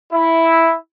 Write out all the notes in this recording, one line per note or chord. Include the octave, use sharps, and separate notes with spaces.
E4